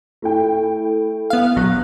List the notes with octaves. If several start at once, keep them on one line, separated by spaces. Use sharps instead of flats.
A3 E4 G5
B3 F5
A#1 F#3 F#6 A#6